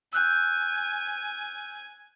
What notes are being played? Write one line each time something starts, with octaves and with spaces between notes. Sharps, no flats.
G#5 E6 F#6 G6